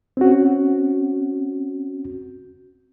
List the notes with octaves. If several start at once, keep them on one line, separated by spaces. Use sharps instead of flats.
C4 C#4 F#4